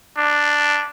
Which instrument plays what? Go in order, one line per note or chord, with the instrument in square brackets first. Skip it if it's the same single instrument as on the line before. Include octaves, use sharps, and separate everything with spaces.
[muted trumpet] D4